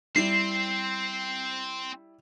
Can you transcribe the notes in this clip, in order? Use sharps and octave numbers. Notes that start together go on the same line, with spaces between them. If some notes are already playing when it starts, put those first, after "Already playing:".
G3 C4 E4 C7